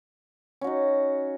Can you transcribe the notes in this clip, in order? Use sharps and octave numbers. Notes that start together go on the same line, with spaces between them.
C#4 D#4 F#4